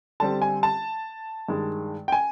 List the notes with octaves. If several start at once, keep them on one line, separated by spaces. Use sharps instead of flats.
D3 G3 C4 A5
G#5
A5
G2 D#3 G#3
G5
G#5